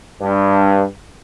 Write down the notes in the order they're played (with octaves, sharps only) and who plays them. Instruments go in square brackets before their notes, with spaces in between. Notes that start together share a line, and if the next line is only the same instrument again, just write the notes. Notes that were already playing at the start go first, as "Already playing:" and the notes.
[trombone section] G2